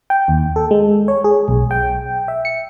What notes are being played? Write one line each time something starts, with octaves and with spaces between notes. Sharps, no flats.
G5
D#2
A4
G#3
C#5
G#4
B1
G5
E5
C#7